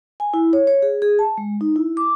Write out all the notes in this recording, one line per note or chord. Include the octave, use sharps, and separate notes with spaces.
G#5
E4
C#5
C#5
G#4
G#4
A5
G#3
D#4
E4
D6